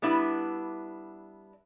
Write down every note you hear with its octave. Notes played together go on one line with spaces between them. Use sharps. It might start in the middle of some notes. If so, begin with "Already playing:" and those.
G3 B3 D4 E4